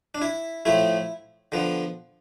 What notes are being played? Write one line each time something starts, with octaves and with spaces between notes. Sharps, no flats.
D4
E4
A2 F3 A3 E4
D3 F3 B3